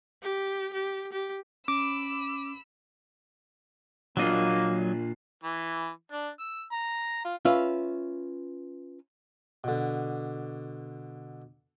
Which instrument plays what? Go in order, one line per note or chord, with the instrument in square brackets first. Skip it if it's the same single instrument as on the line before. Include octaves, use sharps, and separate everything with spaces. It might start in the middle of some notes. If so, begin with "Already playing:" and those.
[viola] G4
G4
G4
[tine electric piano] C#4 [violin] B5 E6 [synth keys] D6
[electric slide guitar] A#2 D4 F4 [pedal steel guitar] F#3 D#5 [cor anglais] A#3
[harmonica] E3
D4
E6
A#5
F4
[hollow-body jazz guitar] C#4 F4 B4 E5
[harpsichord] B2 D3